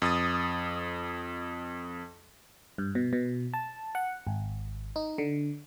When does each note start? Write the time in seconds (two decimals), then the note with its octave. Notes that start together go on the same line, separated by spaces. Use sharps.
0.02 F2 D#6 A6
2.78 G2
2.95 B2
3.13 B2
3.54 A5
3.95 F#5
4.27 G#1
4.96 D#4
5.18 D3